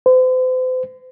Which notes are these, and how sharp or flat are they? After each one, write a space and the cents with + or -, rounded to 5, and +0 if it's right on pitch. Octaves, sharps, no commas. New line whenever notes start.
C5 -40